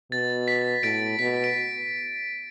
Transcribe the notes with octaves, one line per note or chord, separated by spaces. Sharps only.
B2 A6
B6
A2 A6 D7
B2 B6
D7